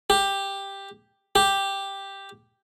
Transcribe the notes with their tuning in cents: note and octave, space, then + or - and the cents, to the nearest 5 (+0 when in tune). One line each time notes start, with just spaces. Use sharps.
G4 +5
G4 +0